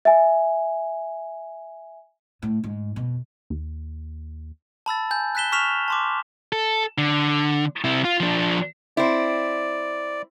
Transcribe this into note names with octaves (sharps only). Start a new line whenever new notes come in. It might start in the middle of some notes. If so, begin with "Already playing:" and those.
E5 G#5
A2
G#2
F2 B2
D#2
A5 B5 E6 A6
G#5 G6
F#6 G6 B6 E7 G7
C#6 F6 B6 E7 F7
A5 C6 D6
A4
D3
C3 E4
F4
F3 D4
C4 E4 D5